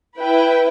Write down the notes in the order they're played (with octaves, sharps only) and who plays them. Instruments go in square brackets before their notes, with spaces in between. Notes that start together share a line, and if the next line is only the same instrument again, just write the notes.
[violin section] E4 B4 G5